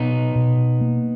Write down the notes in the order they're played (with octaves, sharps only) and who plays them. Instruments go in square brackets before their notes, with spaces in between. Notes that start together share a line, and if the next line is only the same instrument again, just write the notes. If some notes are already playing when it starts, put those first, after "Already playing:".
Already playing: [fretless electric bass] B2 [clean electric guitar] B3 D#4
[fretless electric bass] B2
A#3